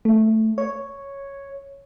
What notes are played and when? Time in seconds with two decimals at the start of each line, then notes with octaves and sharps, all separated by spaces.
0.05 A3
0.58 C#5